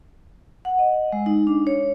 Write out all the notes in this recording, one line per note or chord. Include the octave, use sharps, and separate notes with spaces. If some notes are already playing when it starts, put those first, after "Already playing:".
F#5
D#5
G#3
D#4
D4
C#5